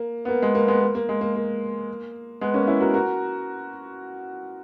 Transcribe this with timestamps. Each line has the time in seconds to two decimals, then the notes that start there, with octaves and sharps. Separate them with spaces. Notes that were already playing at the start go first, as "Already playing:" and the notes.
Already playing: A#3
0.25 B3
0.29 A#3
0.42 G#3
0.55 A#3
0.68 G#3 B3
0.82 A#3
0.95 A#3
1.09 G#3
1.21 A#3
1.36 A#3
2.41 G#3 B3
2.54 A#3 C#4
2.67 C#4 E4
2.80 F#4 A#4
2.94 F#4 A#4